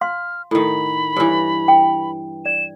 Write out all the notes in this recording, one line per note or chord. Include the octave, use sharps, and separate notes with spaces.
F5 C6 F6
A2 D#3 B5
G2 E3 C#5
G5
D5 E7